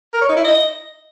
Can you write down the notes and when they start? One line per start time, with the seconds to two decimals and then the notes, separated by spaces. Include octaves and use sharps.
0.13 A#4
0.21 C#5
0.29 D#4
0.37 E4
0.44 D#5